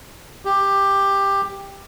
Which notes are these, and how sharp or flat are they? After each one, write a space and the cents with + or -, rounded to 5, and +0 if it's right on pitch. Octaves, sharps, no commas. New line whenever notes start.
G4 +10